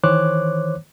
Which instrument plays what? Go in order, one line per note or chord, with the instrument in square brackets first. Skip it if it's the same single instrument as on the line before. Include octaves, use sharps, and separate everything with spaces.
[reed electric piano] D#3 E3 C5 C#5 D6 F#6